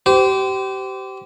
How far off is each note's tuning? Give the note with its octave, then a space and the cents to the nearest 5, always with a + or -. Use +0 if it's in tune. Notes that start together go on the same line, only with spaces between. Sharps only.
G4 -25 C5 -25